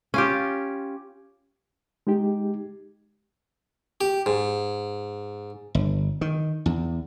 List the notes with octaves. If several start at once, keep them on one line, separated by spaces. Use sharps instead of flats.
C#4 F4 G4
G#3 D#4 G4
G4
G#2
G1
D#3
E2